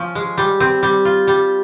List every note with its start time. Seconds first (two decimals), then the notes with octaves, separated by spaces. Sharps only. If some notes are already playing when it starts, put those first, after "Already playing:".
Already playing: F3 C#4
0.15 G#3
0.37 G3
0.60 C4
0.83 G3
1.05 F4
1.27 G3